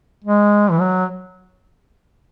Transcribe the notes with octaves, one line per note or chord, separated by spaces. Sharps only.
G#3
E3
F#3